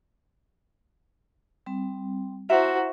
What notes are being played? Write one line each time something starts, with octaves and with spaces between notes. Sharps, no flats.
G3 C4
E4 F#4 C5 E5 F#5 A#5